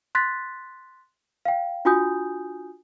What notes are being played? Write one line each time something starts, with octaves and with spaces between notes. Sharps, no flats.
C6 F#6 A6 B6
F5 G5
D4 F4 F#4 G#5 D#6 G6